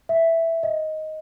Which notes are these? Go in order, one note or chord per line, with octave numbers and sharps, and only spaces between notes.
E5
D#5